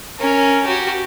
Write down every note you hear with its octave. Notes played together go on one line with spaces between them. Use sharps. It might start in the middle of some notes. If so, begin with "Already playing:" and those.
C#4 A#4
F#4 G4